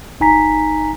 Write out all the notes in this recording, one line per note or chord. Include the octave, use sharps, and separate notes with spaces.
G1 D#4 G#5 A#5 B6